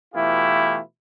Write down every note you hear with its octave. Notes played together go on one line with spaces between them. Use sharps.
B2 E3 A3 E4 F4 G4